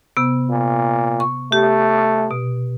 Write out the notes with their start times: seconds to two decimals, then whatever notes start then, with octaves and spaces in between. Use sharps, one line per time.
0.17 C3 B3
0.50 A#2
1.20 C#6
1.52 A3 G4
2.31 B2